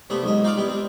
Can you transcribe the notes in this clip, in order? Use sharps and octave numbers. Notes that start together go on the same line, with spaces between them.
C3 A3 B3 D4
B1 G#2 D#5
D#4 F4 D5 F5
G3 B3 E4
C4 D4